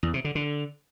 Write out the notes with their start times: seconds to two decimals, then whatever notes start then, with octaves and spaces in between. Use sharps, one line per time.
0.03 E2
0.14 C3
0.24 D3
0.35 D3